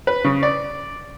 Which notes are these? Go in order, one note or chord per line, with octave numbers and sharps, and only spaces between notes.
B4
C#3
D5